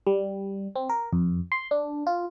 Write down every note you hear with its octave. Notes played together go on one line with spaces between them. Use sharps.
G3
C4
A#4
F2
C6
D4
F4